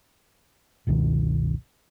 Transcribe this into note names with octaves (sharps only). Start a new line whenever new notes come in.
G1 C#2 B2 D#3